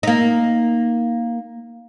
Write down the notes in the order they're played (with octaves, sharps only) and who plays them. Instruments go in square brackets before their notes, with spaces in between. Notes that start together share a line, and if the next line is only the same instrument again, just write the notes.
[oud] A#3 D#4